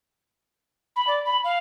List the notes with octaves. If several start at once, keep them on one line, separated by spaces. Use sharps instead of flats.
B5
D5
B5
F5